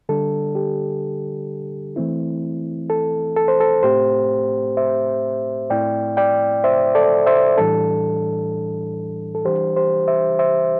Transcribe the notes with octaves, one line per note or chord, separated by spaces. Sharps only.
D3 G3 D4 A4
G4
E3 A3 C4 E4
A4
A4
C5
A4
A2 A3 C4 G4 C5
C5 E5
A2 A3 C4 E4 D5 G5
D5 G5
C5 E5
A4 D5
C5 E5
A2 E3 G3 D4 A4
A4
E3 G3 D4 G4 C5
G4 C5
C5 E5
C5 E5